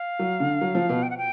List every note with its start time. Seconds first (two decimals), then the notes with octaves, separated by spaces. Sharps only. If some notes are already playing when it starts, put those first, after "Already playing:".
Already playing: F5
0.19 F#3
0.40 D3
0.61 F#3
0.75 F3
0.89 B2
1.03 G5
1.10 F#5
1.18 G5